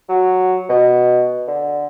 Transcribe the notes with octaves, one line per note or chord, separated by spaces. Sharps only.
F#3
B2
D3